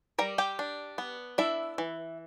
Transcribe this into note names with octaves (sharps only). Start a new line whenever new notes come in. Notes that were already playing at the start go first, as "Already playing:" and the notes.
G3 A#4 A#5
G4 G5
D4
B3
D4 E4 E5
E3